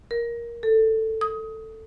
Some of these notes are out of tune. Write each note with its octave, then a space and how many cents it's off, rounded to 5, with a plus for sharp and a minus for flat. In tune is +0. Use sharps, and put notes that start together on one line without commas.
A#4 +10
A4 +10
D#6 +20